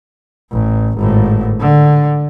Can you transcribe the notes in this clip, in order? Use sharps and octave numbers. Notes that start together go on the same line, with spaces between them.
A1
G#1 A2
D3